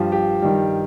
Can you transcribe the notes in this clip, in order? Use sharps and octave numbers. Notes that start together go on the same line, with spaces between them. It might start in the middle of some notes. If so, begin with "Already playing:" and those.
Already playing: G2 F3 G4
G4
G2 D#3 G3